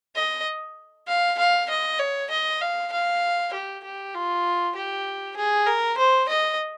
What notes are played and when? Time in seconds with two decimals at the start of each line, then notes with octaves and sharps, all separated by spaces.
0.16 D#5
1.08 F5
1.39 F5
1.70 D#5
1.99 C#5
2.31 D#5
2.62 F5
2.92 F5
3.53 G4
3.84 G4
4.15 F4
4.76 G4
5.37 G#4
5.67 A#4
5.98 C5
6.29 D#5